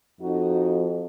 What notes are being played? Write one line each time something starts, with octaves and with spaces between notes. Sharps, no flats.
F2 D#4 F#4